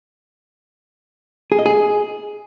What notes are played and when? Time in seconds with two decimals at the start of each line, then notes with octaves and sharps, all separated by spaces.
1.52 G#4
1.59 D#5
1.66 G#4